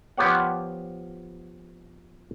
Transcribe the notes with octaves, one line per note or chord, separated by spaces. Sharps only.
F3 B3 G4 C#5 F#5